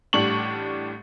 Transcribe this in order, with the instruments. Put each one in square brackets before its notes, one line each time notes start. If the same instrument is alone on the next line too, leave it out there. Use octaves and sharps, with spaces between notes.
[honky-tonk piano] A1 A2 G3 D4 C#6 F#7